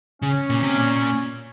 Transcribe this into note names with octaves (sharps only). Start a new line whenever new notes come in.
C#3 C#4
A#2
C3
A#2